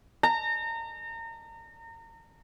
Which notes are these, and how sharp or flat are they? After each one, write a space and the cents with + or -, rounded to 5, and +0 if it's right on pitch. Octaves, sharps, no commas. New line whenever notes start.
A#5 -30